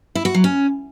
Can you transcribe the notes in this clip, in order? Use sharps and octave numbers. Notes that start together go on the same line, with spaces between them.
E4
F#4
F#3
C#4